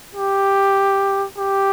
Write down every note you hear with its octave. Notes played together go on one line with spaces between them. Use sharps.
G4
G4